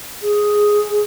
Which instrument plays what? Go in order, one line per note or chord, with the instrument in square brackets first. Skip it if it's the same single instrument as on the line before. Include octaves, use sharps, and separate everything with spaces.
[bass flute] G#4